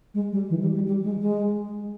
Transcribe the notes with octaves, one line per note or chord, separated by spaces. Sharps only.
G#3
G3
E3
G3
G3
G3
G#3
G#3